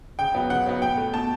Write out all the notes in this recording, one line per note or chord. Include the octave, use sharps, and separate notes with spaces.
C#3 G5
F#3 B3
C#3 F#5
F#3 B3
B2 G5
A3
B2 A5